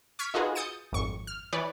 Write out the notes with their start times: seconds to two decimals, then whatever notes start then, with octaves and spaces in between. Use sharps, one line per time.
0.19 C#6 F6 G#6 B6 D7
0.34 D#4 F4 F#4 G#4 B4
0.55 D#6 G6 A6 C#7 D#7
0.92 G#1 F2 C#6
1.27 F6
1.53 E3 B4 C#5 D5